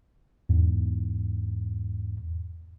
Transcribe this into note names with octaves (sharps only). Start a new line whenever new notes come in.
E2 G#2